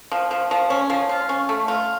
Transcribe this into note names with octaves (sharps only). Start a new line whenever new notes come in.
F3
F3
F3
C#4
F3
F4
C#4
A3
F4